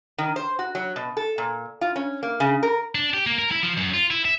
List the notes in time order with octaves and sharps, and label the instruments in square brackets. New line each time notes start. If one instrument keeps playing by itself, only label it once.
[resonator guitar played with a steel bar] D#3
C5
F#4
F#3
B2
A4
A#2
F4
C#4
A#3
C#3
A#4
[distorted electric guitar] D4
G4
A#3
A#4
E4
F3
F#2
F4
E4
E5